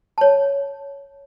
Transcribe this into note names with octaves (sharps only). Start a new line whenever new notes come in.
C#5 A5